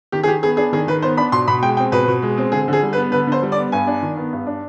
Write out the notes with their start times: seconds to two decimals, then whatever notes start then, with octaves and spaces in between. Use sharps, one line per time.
0.12 D#3 G4
0.23 G#4
0.27 D#3 G4
0.43 B3 G#4
0.57 D4 G#4
0.73 D#3 G#4
0.87 D#3 B4
1.02 B3 C5
1.17 D4 B5
1.32 B2 C6
1.48 B2 B5
1.62 G#3 G5
1.77 C4 G5
1.92 B2 B4
2.08 B2
2.22 G#3
2.38 C4
2.52 D3 G#4
2.68 D3 G#4
2.83 G3
2.93 B4
2.97 B3
3.12 D3 B4
3.27 D3 C5
3.43 G3
3.52 D5
3.57 B3
3.72 G2 G#5
3.87 D4
4.02 D#3
4.17 B3
4.33 G2
4.47 D4